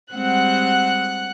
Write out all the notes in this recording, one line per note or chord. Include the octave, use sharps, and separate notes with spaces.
G3 G#3 C4 F#5 F#6